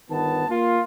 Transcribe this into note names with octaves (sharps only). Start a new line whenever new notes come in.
G1 D#3 B3 A5
A#3 F4